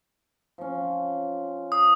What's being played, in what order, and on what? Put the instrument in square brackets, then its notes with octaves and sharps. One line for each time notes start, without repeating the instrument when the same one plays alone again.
[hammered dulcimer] F3 C#4
[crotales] D#6